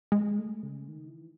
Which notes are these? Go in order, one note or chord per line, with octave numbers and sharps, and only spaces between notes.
G#3
A3
C#3
D#3
E3